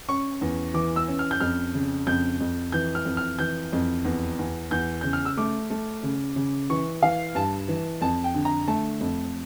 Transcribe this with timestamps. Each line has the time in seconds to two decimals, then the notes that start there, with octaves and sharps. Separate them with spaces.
0.09 C#4 C#6
0.41 E2
0.74 E3 D6
0.96 E6
1.08 C#4
1.19 F6
1.31 G6
1.40 F2 F6
1.74 C#3
2.07 F2 G6
2.40 F2
2.72 E3 G6
2.95 F6
3.05 F2
3.17 F6
3.39 E3 G6
3.73 F2
4.05 E2
4.39 E2
4.71 E2 G6
5.01 C#3 G6
5.13 F6
5.25 E6
5.37 A3 D6
5.70 A3
6.03 C#3
6.36 C#3
6.70 E3 C#6
7.02 E3 F5
7.35 G2 A5
7.68 E3
8.01 F2 A5
8.24 G5
8.35 D3
8.45 A#5
8.68 A3 A5
9.00 F2